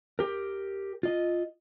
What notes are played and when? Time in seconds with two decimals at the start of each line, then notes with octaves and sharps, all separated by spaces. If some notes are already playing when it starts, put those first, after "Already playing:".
0.19 G4 A#4
1.03 F4 D#5